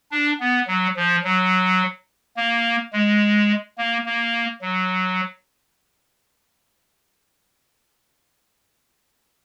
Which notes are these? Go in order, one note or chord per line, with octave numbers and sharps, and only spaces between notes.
D4
B3
F#3
F3
F#3
A#3
G#3
A#3
A#3
F#3